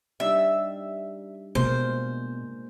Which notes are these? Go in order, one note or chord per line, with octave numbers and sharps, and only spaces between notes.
G3 D4 D#4 E5
B2 G#3 A#3 F4 C5